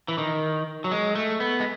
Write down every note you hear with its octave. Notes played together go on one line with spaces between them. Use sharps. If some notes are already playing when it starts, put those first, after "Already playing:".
E3
D#3
F#3
G#3
A3
B3
G#3